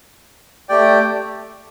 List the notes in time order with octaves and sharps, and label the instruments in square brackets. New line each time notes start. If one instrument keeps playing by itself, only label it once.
[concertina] A3 G4 D5 G5